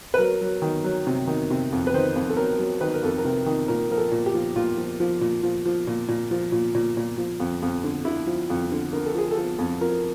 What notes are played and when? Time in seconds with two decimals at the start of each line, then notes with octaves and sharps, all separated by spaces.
0.14 B4
0.18 F#3 A#4
0.41 F#3
0.62 D#3
0.84 F#3
1.07 C3
1.27 D#3
1.50 C3
1.72 F2
1.87 B4
1.94 D#3 C5
2.16 F2
2.30 A4
2.37 F#3 A#4
2.59 F#3
2.81 D#3 B4
2.94 A#4
3.03 F2 A4
3.18 A#4
3.25 C3
3.46 D#3
3.68 A#2 A#4
3.90 F3 A#4
3.97 A4
4.12 A#2
4.26 G4
4.34 F3
4.56 A#2 F4
4.78 F3
5.00 F3
5.21 A#2
5.43 F3
5.65 F3
5.87 A#2
6.08 A#2
6.31 F3
6.52 A#2
6.75 A#2
6.97 A#2
7.18 F3
7.40 F2
7.62 F2
7.84 D3
8.05 D3 E4
8.27 F3
8.50 F2
8.72 D3
8.93 D3 A#4
9.06 A4
9.14 F3 G#4
9.31 A4
9.37 F3
9.59 F2
9.81 F3 A#4